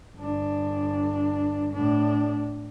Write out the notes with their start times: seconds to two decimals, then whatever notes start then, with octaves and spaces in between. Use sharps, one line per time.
0.16 G1 D4
1.72 A2 D4